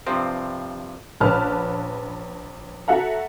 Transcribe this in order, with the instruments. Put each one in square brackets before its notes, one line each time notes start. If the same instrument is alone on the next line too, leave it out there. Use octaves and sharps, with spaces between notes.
[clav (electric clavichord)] G2 C3 F3 C4
[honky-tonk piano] A#1 C#4 B4 A5 F6
F#4 A4 E5 F#5 A#5